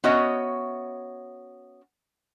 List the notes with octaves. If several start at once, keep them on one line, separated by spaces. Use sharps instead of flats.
B3 C#4 F#4 C#5 D#5 E5